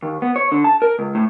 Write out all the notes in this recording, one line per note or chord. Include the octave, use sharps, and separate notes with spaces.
D#2
B3
C#5
D3
A5
A#4
C#2
A2